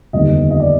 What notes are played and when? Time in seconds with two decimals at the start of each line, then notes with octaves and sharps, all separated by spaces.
0.13 F1 D#2 D3 G3 B3 D#5
0.51 D#5
0.60 D5